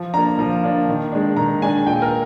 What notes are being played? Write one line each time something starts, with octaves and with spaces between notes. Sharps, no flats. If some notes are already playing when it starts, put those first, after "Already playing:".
Already playing: F3
A#3 D4 A#5
F3
A#3 D4
D#3
G#3 D4
D#3 A#5
G#3 D4 G#5
A#2 G5
A#4